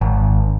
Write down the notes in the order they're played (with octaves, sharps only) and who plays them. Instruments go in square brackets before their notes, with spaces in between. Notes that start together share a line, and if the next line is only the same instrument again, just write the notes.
[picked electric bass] G#1